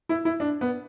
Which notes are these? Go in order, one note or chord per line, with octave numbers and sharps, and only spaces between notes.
E4
E4
D4
B3